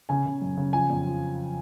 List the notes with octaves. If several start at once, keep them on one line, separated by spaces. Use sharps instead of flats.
C#3 G#5
C#3
F#2
C#3
F3 G#5
F2
F3